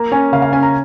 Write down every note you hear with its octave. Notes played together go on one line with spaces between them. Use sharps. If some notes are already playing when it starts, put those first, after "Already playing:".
Already playing: A#3 A#5
C#4 G#5
C#3 F5
F5
C#4 G#5
A#5